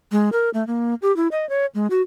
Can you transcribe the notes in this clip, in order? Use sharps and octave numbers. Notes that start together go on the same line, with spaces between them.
G#3
A#4
A3
A#3
G4
E4
D#5
C#5
G#3
F#4